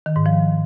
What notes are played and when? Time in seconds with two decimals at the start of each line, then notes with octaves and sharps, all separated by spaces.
0.06 D#3
0.16 G#2
0.26 F3